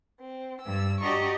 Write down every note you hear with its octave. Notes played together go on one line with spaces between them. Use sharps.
C4
G2 E6
D4 F#4 G4 D#5 A#5 C#6